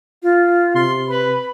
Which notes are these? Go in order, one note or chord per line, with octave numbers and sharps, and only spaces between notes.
F4
C3 C6
B4 B5